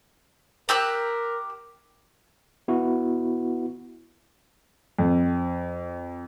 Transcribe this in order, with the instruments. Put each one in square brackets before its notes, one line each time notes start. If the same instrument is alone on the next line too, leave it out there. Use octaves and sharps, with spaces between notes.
[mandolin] G4 E6 F#6 [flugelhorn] A#4
[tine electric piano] B3 E4 F#4
[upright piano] F2